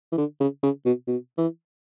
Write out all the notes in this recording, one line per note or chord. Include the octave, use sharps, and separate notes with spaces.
E3
D3
C#3
C#3
B2
B2
E3